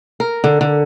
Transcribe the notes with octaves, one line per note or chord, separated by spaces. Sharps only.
A#4
D3
D3